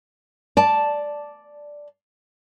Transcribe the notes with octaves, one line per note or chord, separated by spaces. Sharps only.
D5 A5